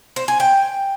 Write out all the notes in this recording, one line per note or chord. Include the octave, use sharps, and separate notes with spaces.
C5
G#5
G5